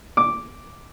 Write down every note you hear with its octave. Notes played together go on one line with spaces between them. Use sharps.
D6